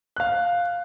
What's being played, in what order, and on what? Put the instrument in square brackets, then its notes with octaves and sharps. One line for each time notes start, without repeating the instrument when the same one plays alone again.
[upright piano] F5 F#6